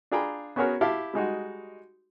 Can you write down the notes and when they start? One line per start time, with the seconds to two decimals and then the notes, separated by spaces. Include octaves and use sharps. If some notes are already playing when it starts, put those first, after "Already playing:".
0.11 D4 F4 G#4 G5 A#5 B5
0.56 B3 C#4 F#4 G#4 A#4 C#5
0.81 E4 G4 F5 A5
1.13 G3 G#3 D#4 F#4